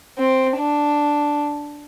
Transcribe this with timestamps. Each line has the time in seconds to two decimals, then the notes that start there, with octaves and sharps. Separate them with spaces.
0.19 C4
0.58 D4